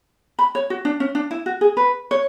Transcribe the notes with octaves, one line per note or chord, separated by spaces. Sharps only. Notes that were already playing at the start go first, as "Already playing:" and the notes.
B5
C#5
F#4
D4
C#4
D4
E4
F#4
G#4
B4
C#5